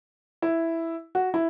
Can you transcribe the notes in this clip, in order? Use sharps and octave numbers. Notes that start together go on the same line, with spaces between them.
E4
F#4
E4